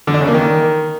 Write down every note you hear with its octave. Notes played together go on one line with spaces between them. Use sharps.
D3
D4
C#3
A#3
D#3